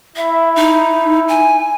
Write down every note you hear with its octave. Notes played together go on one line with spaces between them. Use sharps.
E4 E5
D#4
G#5